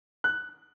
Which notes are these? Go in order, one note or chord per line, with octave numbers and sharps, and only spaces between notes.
F#6